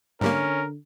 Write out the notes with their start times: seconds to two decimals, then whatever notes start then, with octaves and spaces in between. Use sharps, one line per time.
0.21 G#2 D3 G3 A#3 C#4 A#4